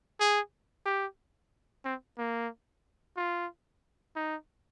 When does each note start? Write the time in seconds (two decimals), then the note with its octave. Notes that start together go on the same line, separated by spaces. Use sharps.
0.20 G#4
0.86 G4
1.85 C4
2.18 A#3
3.17 F4
4.16 D#4